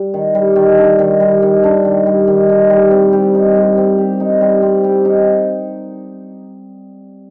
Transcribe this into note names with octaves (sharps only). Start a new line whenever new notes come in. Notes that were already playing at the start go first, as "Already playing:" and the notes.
Already playing: G3
D#3
G3
D#3
D4
D#3
G3
D#3
D4
D#3
G3
D#3
D#4
G3
C4
G4
D#4
G3
C4
G4
D#4
G3
C4
G4
D#4